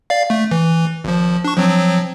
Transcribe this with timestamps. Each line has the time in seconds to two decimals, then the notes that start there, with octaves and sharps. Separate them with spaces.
0.10 D5 F5
0.30 A3
0.51 E3
1.04 G#1 F3
1.44 D4 C#6
1.57 F3 F#3 C4